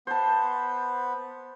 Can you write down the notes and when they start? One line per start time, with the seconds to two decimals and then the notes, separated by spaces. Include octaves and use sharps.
0.07 B3 C5 A5